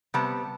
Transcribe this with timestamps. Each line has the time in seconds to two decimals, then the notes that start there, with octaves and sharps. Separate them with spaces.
0.14 C3 G3 B3 A5